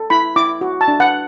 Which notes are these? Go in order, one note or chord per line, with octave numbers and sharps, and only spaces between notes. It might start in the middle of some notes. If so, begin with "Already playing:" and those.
Already playing: A4
E4 B5
E4 D6
F#4
A5
D4
F#5